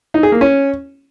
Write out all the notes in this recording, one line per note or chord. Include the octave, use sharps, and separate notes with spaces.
D#4
G#4
A#3
C#4